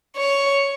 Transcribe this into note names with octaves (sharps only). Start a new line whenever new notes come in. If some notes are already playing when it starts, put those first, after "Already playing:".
C#5